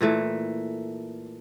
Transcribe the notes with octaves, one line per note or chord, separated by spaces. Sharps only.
A#2 E3 A3